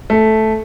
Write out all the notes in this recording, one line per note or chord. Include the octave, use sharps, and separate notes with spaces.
A3